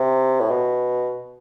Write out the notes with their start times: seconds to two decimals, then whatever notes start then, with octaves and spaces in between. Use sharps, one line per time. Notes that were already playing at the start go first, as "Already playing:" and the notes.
Already playing: C3
0.40 A2
0.51 B2